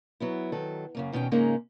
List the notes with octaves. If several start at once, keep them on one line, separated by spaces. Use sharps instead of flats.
F#3 B3 E4
D#3 F#3 A4
F#2 C#3 A#3
E2 B2 D#3 C#4 G5
G#2 C#3 G#3 A#3 D#4